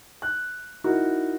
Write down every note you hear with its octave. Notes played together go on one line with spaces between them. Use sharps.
F#6
D#4 E4 F#4 A#4